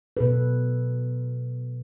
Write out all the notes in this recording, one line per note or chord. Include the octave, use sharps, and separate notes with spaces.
B2 A4 B4